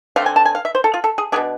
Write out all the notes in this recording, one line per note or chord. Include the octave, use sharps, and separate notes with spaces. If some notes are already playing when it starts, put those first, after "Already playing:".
D3 A3 C4 F5
G#5
A5
G#5
F5
E5
C5
A4
F4
A4
G#4
B2 B3 D4 G#4